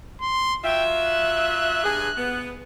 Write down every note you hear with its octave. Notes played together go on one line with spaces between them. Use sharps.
C6
F#3 F4 E5 G5
F#6
G2 G#4
B3